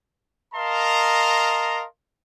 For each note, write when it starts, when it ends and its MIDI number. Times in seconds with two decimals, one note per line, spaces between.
0.55 1.84 70
0.55 1.84 75
0.55 1.84 77
0.55 1.84 81
0.55 1.84 82
0.55 1.84 84